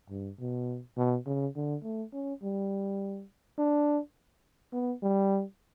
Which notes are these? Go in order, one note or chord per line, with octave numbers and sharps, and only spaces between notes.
G2
B2
B2
C#3
D3
A3
C#4
G3
D4
B3
G3